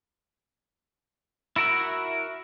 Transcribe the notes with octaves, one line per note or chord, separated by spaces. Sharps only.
E4 F#4 A#4 E5 F#5